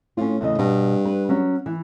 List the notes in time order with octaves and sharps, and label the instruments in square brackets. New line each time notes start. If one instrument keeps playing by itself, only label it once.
[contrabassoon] A2 [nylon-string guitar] C#4 F4
[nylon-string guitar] E2 C#3 D#5 [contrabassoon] A2
[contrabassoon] G2 [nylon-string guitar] B2
[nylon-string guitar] B4
F#3 C#4
E3